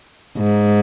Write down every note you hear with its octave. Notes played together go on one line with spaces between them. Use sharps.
G#2